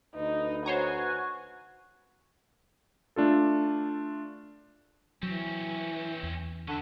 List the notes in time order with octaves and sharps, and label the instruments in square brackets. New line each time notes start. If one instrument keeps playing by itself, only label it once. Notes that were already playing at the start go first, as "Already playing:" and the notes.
[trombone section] D2 B4 [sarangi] D#4
[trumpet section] F#4 [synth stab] C5 C#5 A#5 [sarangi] G#5
[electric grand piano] A3 D4 F4 A4
[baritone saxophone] E3 [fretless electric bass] F#3 [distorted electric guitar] C4 C#4
[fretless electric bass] E2
[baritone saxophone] D3 [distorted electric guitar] C#4 E5